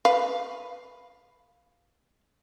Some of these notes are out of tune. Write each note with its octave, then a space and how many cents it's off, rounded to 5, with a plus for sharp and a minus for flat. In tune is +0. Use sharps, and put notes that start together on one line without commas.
B4 +0 F5 +0